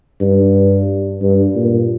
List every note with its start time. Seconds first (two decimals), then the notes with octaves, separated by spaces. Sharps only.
0.21 G2
1.22 G2
1.55 A#2